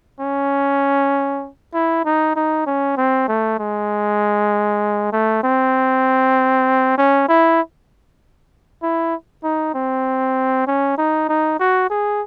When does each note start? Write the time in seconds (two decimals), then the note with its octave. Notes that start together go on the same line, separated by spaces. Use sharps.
0.20 C#4
1.74 E4
2.05 D#4
2.36 D#4
2.66 C#4
2.97 C4
3.28 A3
3.59 G#3
5.13 A3
5.43 C4
6.98 C#4
7.28 E4
8.82 E4
9.43 D#4
9.74 C4
10.67 C#4
10.98 D#4
11.29 D#4
11.59 F#4
11.90 G#4